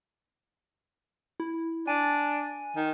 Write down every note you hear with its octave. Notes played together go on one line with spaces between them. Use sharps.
E4
D4 G#5
D#3